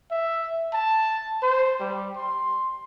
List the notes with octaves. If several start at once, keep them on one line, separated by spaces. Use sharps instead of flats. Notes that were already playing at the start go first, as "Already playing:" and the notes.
E5
A5
C5
G3
C6